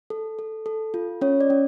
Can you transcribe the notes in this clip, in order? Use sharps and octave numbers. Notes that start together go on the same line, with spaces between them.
A4
A4
A4
F4
C#4 C#5
D5
C#4